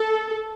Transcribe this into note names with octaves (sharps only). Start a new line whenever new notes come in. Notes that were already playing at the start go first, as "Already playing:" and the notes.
Already playing: A4